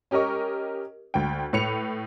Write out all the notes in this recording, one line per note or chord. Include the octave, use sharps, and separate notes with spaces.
C#4 G4 A#4 D#5 C#6
D2 G5
A2 B4 C#7 F7